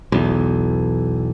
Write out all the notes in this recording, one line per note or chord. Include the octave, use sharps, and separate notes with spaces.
B1 E2